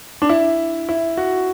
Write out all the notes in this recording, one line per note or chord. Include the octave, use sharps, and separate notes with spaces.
D4
E4
E4
F#4